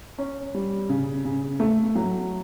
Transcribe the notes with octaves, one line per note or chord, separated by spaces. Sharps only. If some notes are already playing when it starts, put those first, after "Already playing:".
C#4
G3
C#3
C#3
A3
F#3